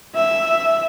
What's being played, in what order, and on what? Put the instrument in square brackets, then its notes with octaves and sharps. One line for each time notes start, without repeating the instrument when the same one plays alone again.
[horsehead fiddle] E5